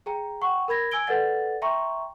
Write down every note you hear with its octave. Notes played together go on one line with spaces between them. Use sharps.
G#4 G5 A#5
F#5 G5 C#6
A#4 B5 G#6 A#6
G#5 E6 G#6 D7 G7
A4 B4 D5 F#5 A6
E5 G5 A#5 C6 C#6